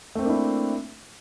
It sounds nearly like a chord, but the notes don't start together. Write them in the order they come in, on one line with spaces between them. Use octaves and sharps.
A3 C4 A#3 D4 E4